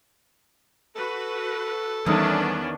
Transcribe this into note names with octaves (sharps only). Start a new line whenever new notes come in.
F#4 A4 B4
E2 D#3 E3 G3 B3 C#4 D4